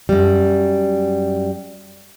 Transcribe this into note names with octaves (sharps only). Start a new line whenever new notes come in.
F#2 G3